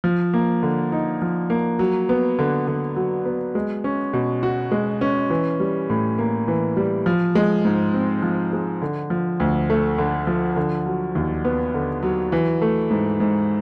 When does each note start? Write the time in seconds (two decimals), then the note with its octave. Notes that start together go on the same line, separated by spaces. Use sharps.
0.04 F3
0.34 A#3
0.63 D3
0.92 D#4
1.22 F3
1.50 A#3
1.79 F#3
2.09 B3
2.39 D3
2.67 D3
2.96 F#3
3.25 B3
3.55 G#3
3.84 C#4
4.13 B2
4.43 F#4
4.72 G#3
5.01 C#4
5.30 E3
5.60 G3
5.90 A2
6.18 A#3
6.48 E3
6.77 G3
7.06 F3
7.35 G#3
7.65 G#2
7.94 C4
8.22 F3
8.53 G#3
8.82 D3
9.10 F3
9.40 D2
9.70 A3
9.98 D3
10.27 F3
10.56 D3
10.86 F#3
11.15 D#2
11.45 B3
11.74 D3
12.03 F#3
12.32 E3
12.62 A3
12.91 G#2
13.20 G#2